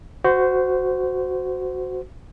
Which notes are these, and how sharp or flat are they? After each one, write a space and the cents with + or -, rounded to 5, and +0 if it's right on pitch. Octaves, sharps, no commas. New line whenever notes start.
F#4 +0 C5 -20